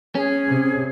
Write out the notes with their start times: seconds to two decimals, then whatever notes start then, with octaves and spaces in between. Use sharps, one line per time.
0.15 C#4 G#4
0.48 C3